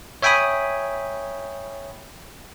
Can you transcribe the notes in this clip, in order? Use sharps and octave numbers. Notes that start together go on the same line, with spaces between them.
C#5 E5 G5 G#5 B5 D#6